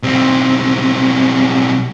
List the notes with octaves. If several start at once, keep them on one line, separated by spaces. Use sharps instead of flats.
B1 C4